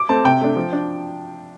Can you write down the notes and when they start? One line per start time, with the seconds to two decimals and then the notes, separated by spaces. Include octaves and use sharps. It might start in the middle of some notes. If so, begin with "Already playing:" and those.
Already playing: D6
0.09 A3 C4 A5
0.24 C3 G5
0.41 A3 D4
0.56 F3
0.73 D4